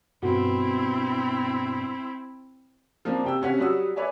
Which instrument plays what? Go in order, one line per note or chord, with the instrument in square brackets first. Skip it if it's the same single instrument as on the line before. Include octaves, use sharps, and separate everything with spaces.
[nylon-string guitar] G2 B2 F#4 [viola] C4 E4
[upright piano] F3 A#3 C4 D4
C3 G5 E6
C3 C#4 F#5 B6
F#3 G3 C#5 F#5 D#6 E6
B4 C#5 D5 E5 G#5